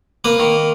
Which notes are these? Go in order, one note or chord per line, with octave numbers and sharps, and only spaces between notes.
A#3 B4
D#3